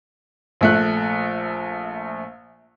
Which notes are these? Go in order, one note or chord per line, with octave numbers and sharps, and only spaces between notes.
A#1 A3 F#6